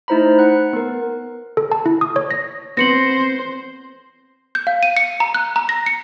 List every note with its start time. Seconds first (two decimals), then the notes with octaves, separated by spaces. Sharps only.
0.08 A3 D#4 E4 C5 A#5 B5
0.39 F#5 F#6
0.73 B3 A#4
1.57 A4
1.72 A5
1.86 E4
2.01 D#6
2.16 C#5
2.31 A#6
2.77 B3 C4 C5 A#6 C#7 F#7
4.55 G6
4.67 F5
4.83 D#7
4.97 C#7
5.20 A#5
5.34 F#6
5.56 A#5
5.69 A#6
5.86 C#7